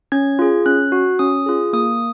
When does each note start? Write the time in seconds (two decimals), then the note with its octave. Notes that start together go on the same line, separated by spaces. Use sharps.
0.12 C#4 G#6
0.39 F4 G#4
0.66 C#4 F#6
0.92 F#4
1.19 C#4 D#6
1.46 F4 G#4
1.73 A#3 D#6